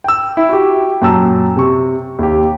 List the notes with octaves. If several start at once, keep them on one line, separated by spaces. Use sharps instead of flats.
G5 E6
E4
F#4 G4
F#2 A#2 G5 A5 A#5 E6
C3 C#6
D#2 G4